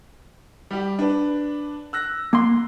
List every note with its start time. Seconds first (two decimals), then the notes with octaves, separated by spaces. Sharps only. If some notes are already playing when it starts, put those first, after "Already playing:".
0.71 G3 G4
0.99 D4 B4
1.93 E6 F#6 A#6
2.33 A#3 C6